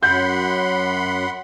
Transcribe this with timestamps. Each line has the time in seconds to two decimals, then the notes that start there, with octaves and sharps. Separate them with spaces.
0.03 F#2 F#5 B5 C6 G6